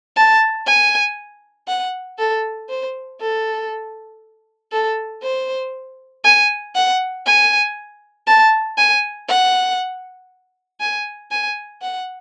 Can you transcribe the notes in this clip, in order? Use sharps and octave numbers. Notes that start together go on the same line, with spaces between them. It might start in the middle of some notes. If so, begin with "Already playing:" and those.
A5
G#5
F#5
A4
C5
A4
A4
C5
G#5
F#5
G#5
A5
G#5
F#5
G#5
G#5
F#5